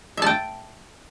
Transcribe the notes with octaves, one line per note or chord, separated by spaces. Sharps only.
E5 G5 A5